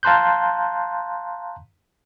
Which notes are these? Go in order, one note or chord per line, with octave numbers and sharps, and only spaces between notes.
F5 A5 A#5 C6 F#6 G6